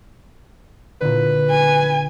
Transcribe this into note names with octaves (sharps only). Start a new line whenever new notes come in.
A#2 D3 B4
G#5